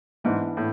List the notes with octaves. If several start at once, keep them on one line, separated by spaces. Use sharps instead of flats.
G#2 E3 B3 D4
A2